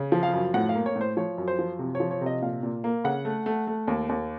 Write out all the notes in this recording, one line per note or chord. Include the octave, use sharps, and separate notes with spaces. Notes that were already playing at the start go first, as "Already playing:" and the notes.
Already playing: C#3
F3
F5
F#2
A2 F#5
F5
A#3
C#5
A2
C5
F3 C#5
F#2
C5
F3
C3
C#5
F3
C#5
C3
D#5
A#2 F5
A#2
A#3
C#3 F#5
A3
A3
A3
D#2
D#2